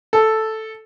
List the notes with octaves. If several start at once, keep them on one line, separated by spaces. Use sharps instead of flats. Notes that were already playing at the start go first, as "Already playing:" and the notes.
A4